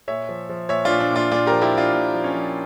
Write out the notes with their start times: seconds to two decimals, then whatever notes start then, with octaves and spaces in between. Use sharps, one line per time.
0.08 A#2 C#5 E5
0.29 F3
0.49 F3
0.69 A#2 C#5 E5
0.85 A#2 D4 F4
1.00 D4
1.11 A#2
1.16 D4 F4
1.31 A#2 D4 F4
1.46 F3 G4 A#4
1.62 E4 G4
1.73 F3 D4 F4
1.93 A#2 D4
2.13 F3
2.24 C#4
2.34 F3